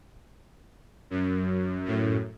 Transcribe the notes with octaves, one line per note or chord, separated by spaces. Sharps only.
F#2
F#2 A2